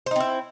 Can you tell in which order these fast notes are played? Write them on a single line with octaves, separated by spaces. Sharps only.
C5 D#4 C4 E4